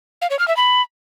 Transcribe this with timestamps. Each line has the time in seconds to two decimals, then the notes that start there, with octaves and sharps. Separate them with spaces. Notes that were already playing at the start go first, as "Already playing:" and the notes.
0.21 F5
0.30 C#5
0.39 F6
0.48 E5
0.57 B5